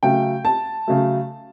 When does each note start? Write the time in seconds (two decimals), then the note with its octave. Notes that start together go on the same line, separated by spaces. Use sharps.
0.03 C#3 F#3 A3 G5
0.45 A5
0.87 C#3 F#3 A3